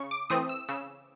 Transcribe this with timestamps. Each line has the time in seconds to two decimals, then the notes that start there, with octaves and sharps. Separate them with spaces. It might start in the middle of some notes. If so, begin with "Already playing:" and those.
Already playing: C#3 C#6
0.11 D6
0.30 E3 A3 C4 D#6
0.49 E6
0.68 C#3 E6